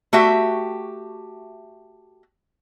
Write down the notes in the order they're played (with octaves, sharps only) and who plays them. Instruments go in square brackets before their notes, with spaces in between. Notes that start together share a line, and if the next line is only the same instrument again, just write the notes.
[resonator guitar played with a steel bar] A3 F#4 G4 E5